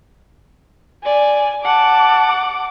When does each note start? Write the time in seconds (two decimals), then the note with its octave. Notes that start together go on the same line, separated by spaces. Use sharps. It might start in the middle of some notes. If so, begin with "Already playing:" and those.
1.05 D5 G#5
1.65 F#5 A5 D6